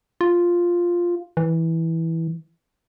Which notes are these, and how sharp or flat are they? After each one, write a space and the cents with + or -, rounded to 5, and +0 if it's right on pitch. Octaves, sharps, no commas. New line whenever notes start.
F4 +0
E3 -10